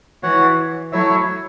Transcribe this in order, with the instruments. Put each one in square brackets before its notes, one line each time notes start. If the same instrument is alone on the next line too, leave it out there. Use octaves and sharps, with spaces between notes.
[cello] E3 [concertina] F#4 C#5 F#5
[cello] F#3 [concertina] A3 E4 C#5 E5